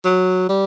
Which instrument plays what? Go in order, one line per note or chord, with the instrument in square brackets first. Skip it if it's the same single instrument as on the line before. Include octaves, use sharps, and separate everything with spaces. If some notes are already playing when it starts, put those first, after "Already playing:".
[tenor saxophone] F#3
G3